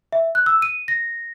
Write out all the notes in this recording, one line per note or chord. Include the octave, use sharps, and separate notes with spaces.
E5
F#6
E6
D#7
A#6